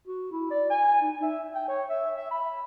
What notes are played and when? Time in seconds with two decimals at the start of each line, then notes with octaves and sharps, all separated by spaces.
0.08 F#4
0.32 E4
0.51 D5
0.70 G#5
1.02 D#4
1.23 E5
1.55 G5
1.69 C#5
1.90 E5
2.16 E5
2.31 B5